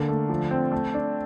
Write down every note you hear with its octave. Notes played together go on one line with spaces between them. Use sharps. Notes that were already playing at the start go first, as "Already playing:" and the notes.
Already playing: D3 A#3
A3
F3
C4
A3
D4